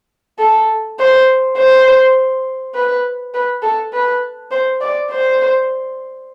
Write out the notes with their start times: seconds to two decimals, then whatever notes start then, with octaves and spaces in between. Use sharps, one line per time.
0.39 A4
0.99 C5
1.57 C5
2.75 B4
3.34 B4
3.63 A4
3.93 B4
4.51 C5
4.81 D5
5.11 C5